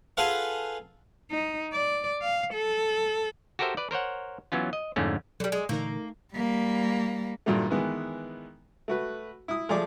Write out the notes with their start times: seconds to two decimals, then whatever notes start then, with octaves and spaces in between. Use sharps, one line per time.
0.17 F4 G#4 A4 B4 F5 F#5
1.31 D#4
1.73 D5
2.22 F5
2.53 A4
3.59 F#4 G4 A4 A#4 C5 E5
3.77 B4 D5
3.91 A#4 C5 C#5 F#5
4.52 E3 F#3 B3 C#4 F4
4.73 D#5
4.96 F2 G#2 D3 A3 C#4
5.40 D3 F#3 G3 A4
5.52 G#3 G#5 D6
5.69 A#2 D3 E3 A3 A#3 D#4 A#4
6.35 G3 A#3
7.46 G2 A#2 D#3 F#3 G3 A3
7.70 D#3 E3 G#3 B3
8.88 A3 F#4 B4
9.48 E4 D#6
9.69 F3 A3 G#4 D5 D6